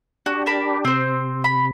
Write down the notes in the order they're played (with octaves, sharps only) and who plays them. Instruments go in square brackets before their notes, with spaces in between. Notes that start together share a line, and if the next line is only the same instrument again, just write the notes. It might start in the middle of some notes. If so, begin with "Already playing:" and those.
[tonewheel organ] D4 G4 [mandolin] F#4
[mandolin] A#4 A5 B5
[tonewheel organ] C3 [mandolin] C4 C5
[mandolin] B5